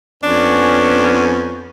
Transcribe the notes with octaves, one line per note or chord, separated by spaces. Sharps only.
F2 B3 C#4 D4